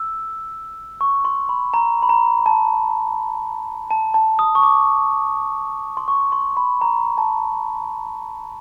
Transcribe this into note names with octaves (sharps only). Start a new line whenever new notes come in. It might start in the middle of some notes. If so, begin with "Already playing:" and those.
Already playing: E6
C#6
C6
B5
A#5
B5
A#5
A5
A5
A5
D#6
C#6
D6
C6
C#6
C6
B5
A#5
A5